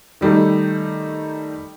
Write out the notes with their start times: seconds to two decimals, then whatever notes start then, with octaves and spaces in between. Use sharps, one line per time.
0.21 D#3 G3 A3 D#4